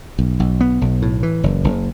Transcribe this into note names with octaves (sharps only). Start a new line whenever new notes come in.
B1
B1
B3
B1
A2
E3
F#1
F#1